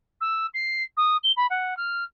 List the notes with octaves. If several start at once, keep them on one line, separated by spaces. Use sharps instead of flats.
E6
C7
D#6
G7
B5
F#5
F6